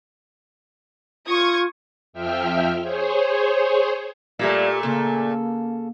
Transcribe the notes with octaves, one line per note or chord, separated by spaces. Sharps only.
F4 C#6 D#6 G#6
F2 F3 E5 G5 F6
G#4 C5 C#5
A#2 G3 A3 A#3 E4 G4
C#3 A#3 A4